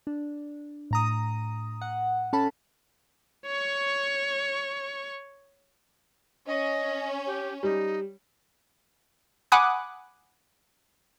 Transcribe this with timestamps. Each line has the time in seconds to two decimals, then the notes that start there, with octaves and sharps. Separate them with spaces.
0.07 D4
0.91 A2 A#5 D#6
1.81 F#5
2.33 C#4 A4 A5 B5
3.46 C#5 C#6
6.47 C#4 D#5
7.26 G4
7.63 G3 D#4
9.52 F#5 G#5 B5 D6 D#6 F#6